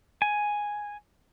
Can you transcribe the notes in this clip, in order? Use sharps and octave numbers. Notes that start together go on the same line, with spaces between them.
G#5